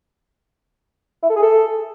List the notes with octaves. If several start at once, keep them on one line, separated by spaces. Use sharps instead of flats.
E4
A4
G#4
A4